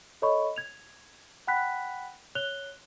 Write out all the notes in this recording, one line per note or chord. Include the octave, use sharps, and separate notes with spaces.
A4 C#5 D#5 B5 C#6
G#6 F7
F#5 G5 B5 F#6 B6
C#5 F#6 F7 G7